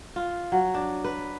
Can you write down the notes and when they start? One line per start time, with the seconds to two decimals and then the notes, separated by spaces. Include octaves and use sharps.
0.16 F4
0.52 F#3
0.75 D4
1.04 B4